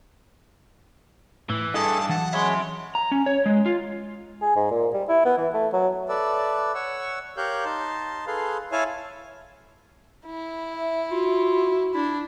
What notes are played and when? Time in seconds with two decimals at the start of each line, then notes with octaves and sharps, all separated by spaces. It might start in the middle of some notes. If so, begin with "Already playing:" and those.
1.50 A2 E3
1.74 G2 E4 G#4 A4 D#5 A5
2.09 E3 F#3 F#5 A5
2.33 G#3 C#5 E5 B5 C6
2.95 A#5
3.12 C#4
3.26 C#5
3.46 G#3
3.66 F4
4.41 G#4
4.56 G#2
4.71 A#2
4.93 G3
5.09 E4
5.25 B3
5.37 E3
5.54 A3
5.73 F#3
6.09 A4 B4 D5 E5
6.75 C#5 F#5 C#6 E6
7.37 G4 A#4 C#5 F5 F#6 G6
7.65 D#4 A5 C6
8.27 G#4 A4 B4 F5 C6
8.72 E4 C#5 E5 F5 G#5 A5
10.26 E4
10.74 E5
11.11 F4 F#4
11.94 D4 E4